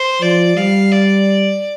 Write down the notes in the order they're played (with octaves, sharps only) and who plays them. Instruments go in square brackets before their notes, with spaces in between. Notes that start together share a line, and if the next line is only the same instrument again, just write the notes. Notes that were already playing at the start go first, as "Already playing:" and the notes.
Already playing: [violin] C5
[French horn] F3 [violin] D5
[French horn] G3 [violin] F5
[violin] D5